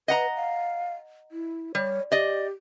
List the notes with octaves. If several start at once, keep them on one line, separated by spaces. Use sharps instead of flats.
B4 D#5 F#5 A#5
F5
E4
G3 C#5
G4 D5 D#5